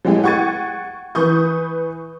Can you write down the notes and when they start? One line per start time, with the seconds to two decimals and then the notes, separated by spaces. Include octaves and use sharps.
0.05 F#3 G#3 A3 E4 G4 G#4
0.24 F#5 G5 C#6 G#6 A6 D#7
1.15 E3 B4 C#6 D#6 G6